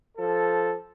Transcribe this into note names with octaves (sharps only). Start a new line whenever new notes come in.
F3 A4